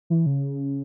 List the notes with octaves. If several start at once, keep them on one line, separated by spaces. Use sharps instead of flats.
E3
C#3